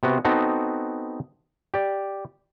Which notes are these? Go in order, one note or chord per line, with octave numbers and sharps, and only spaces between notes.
C3 B3 F#4
B3 C4 D#4 F#4 A4
G4 D5